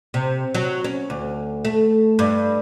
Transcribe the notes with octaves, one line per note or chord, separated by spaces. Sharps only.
C3
F#3
C#4
D2
A3
G2